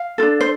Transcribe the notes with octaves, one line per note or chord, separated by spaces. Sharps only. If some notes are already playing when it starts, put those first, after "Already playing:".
Already playing: F5
D4 F4 A4
C5